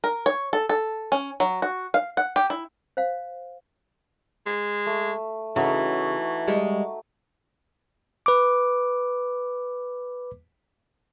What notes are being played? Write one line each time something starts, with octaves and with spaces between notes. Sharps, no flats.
A#4
C#5
A4
A4
C#4
F#3
F#4
F5
F#5
G4
E4
C5 F5
G#3
A3
C#3 E3 A3 D#4 F#4
G3 G#3
B4 D6